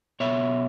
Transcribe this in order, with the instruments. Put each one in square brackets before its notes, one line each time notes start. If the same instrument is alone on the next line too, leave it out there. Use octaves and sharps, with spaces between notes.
[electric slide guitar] B2 C#5 E5